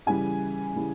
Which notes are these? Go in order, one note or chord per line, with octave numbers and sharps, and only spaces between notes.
C#3 E3 G3 G#5
C#3 E3 G3